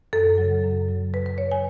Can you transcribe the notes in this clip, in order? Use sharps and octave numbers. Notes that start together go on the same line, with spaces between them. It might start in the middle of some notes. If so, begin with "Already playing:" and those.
F#2 A4
C#3 F#3
F#2
C#3 F#3
F#2 B4
B4
C#3 F#3 C#5
G#5